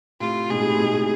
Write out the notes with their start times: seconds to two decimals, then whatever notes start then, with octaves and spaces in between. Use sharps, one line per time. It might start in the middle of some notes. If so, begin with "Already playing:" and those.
0.20 A2 C3 F4
0.50 G#2 B2 G#4
0.60 A2 C3
0.70 A2
0.79 G#2 B2
0.94 A2 C3